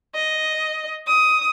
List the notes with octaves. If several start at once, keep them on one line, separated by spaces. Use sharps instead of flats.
D#5
D#6